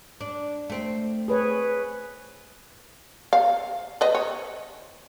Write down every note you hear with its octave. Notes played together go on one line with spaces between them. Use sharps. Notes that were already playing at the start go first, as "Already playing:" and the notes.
D4
A3 C4
G#4 B4 C#5
F5
B4 D#5
C#5